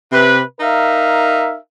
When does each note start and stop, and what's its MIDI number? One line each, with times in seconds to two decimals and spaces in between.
0.12 0.42 48
0.12 0.42 71
0.60 1.57 63
0.60 1.57 70
0.60 1.57 76
0.60 1.57 77